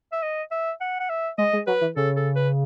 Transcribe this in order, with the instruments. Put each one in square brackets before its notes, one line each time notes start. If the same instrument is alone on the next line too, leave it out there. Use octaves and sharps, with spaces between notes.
[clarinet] E5
D#5
E5
F#5
F#5
E5
[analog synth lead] G#3 [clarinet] D#5
[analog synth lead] G#3
[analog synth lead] F#3 [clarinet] B4
[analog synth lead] E3
[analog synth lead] C#3 [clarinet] A4
[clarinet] A4
B4